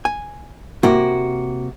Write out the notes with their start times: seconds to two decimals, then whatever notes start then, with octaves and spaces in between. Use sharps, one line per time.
0.05 G#5
0.83 C3 A#3 F#4